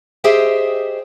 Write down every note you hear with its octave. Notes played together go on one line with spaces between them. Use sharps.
G4 G#4 C5 D#5 E5 G5